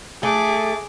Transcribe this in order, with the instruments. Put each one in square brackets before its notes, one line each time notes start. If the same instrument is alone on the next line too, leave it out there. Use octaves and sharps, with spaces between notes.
[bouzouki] A3 [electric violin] G#4 D6